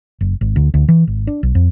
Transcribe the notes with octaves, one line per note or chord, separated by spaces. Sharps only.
F#1
G#1
D2
D2
E3
G#1
D4
B1
F2